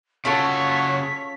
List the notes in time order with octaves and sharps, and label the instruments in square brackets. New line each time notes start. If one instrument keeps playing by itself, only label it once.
[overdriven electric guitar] C#3 F#4 [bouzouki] C#4 F4 A4 [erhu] C#5 [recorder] B6